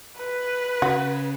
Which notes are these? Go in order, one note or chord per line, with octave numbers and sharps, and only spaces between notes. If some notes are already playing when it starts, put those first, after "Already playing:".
B4
C#3 F#4